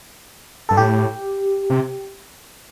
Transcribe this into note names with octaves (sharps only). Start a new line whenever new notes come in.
G2 A4
A2 G4
C3